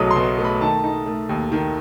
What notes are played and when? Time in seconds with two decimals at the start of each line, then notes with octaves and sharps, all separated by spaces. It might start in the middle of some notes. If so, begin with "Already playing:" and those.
Already playing: B1 B2 F#3 A3 D#6
0.11 C6
0.16 B2
0.38 A3
0.44 B5
0.61 D#3 A5
0.84 D#4
1.06 A3
1.29 D#2
1.52 D#3